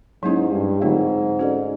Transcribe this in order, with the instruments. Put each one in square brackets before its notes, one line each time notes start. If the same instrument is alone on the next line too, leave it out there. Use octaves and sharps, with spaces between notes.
[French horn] G#2 [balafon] F#3 A#3 C#4 E4 G#4
[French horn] G2
[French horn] G#2 [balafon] D3 F#3 A3 C4 F4
[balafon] C#4 F#4 A4 D5